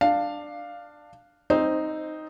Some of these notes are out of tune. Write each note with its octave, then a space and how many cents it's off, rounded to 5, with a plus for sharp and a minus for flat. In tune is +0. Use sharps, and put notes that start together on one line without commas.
D4 +10 F5 +0
C4 +10 D#4 +0 C5 +0